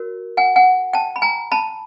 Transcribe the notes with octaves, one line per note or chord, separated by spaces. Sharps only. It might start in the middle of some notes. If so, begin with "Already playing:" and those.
Already playing: F#4 A#4 C#5
F#5 G#5
F#5 G#5
G5 A5
B5
G#5 A#5
A5 B5